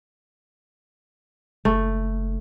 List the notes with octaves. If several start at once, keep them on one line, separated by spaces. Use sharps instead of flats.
F#1 A3